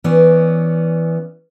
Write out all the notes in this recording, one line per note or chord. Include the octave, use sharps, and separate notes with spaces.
E3 B3 C#4 D5